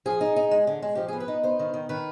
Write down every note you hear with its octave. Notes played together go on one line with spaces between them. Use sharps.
F3 G#4
D#4
D#4
G#3
D3
G#3
F3 G4
B3 G#4
B4
D#4
B3 C5
D#3
D#3
D#3 B4